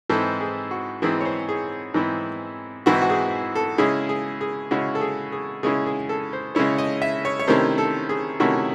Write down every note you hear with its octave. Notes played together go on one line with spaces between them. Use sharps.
G#2 E3 C4 E4 A4
G#4
F#4
G#2 E3 C4 E4 G#4
C#5
C5
G#4
G#2 E3 C4 E4
G#2 E3 C4 E4 F#4
F#4
G#4
A4
C#3 G#3 C#4 E4 G#4
G#4
G#4
C#3 G#3 C#4 E4 F#4
A4
G#4
G#4
C#3 G#3 C#4 E4 G#4
G#4
A4
C5
C#3 G#3 C#4 E4 C#5
D#5
E5
C#5
C#5
C3 D#3 A3 C#4 E4 C5
A4
G#4
C3 D#3 A3 C#4 E4 F#4